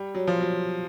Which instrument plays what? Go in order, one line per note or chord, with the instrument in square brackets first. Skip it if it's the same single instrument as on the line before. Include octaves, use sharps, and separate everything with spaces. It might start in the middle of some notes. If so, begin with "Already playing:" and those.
Already playing: [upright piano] G3
F#3
F3
F#3